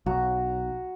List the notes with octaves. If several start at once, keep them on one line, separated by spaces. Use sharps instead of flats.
B1 F#4 A#5